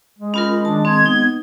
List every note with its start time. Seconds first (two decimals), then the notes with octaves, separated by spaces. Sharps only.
0.19 G#3
0.34 C#4 F4 A#4 B5
0.65 D#3 D4 A5
0.85 C4 G#6
1.06 B3 D#4